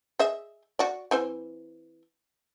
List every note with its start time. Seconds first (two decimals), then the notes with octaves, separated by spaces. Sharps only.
0.19 G#4 D#5 E5
0.79 F#4 D5
1.11 E3 C4 C5